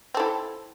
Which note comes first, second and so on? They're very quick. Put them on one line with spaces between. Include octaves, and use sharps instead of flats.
C4 A4 E4